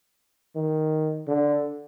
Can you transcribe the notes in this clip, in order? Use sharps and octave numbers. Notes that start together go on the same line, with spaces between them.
D#3
D3